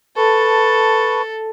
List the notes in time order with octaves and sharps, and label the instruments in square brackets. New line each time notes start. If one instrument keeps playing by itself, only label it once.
[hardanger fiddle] A4 [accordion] B4 A5 C#6